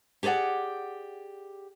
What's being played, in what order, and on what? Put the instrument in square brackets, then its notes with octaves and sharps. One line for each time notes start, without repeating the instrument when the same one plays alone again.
[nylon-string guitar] G4 G#4 B4 D5 F#5